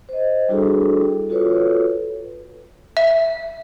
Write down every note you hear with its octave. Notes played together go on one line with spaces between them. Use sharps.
C5 D#5
G3 D4 E4 F#4 G#4 A4
F4 F#4 A4 B4 C#5
E5